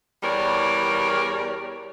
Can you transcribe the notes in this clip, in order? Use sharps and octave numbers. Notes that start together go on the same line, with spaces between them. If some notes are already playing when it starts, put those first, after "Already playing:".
E2 G3 A#4 C#5 D5